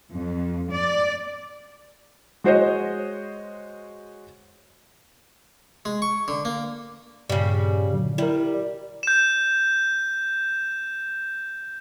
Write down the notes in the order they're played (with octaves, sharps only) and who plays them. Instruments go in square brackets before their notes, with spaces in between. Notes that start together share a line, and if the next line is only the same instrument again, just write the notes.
[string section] F2
D5
[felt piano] G#3 F#4 C5 C#5 D#5
[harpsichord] G#3
C#6
D3
A#3
[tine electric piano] G2 A#2 [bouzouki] C#3 G3
[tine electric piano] A#2 D3 F#3
[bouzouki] G3 [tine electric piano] E4 A#4
[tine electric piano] D5
[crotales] G6 E7